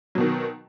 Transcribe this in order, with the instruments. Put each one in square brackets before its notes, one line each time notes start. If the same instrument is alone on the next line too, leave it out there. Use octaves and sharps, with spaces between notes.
[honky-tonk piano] F#3
B2
D#3